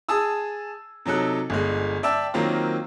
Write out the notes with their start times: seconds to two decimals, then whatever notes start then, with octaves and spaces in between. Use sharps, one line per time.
0.09 G#4 A5 D#6 E6
1.06 C3 F#3 D#4 A4 F#6
1.50 G1 D3 G#3
2.03 D5 E5 G5 A5 E6
2.34 D#3 F#3 A#3 C4 F4